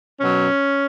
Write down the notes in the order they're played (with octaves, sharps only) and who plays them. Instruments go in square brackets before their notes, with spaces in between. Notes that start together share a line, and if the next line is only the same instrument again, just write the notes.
[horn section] B2 F#3 C#4